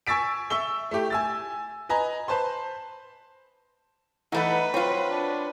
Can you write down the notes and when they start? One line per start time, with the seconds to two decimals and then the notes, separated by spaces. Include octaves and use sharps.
0.07 G#5 C#6 E6 A6 B6 D7
0.50 E5 C#6 E6 G7
0.91 A3 E4 G4
1.10 G#5 E6 A6
1.89 B4 D#5 G#5 A#5
2.28 B4 C5 A5 C6
4.32 E3 A3 B3 D#4 B4 F#5 B5
4.74 F#3 C4 F4 C#5
5.10 D4